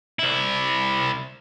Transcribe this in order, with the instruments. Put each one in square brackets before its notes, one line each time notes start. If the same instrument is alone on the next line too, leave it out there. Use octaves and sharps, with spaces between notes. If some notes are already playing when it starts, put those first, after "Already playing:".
[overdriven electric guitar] C2 E4